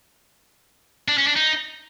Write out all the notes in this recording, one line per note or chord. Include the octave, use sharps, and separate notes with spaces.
D4
C#4
D4
D#4